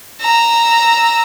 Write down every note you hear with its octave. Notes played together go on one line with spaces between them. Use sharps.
A#5 E6